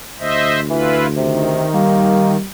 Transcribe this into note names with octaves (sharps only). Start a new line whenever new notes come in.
D2 C5 D#5 E5
E3 E4 F4 B4
C3 D#3
G3 A#3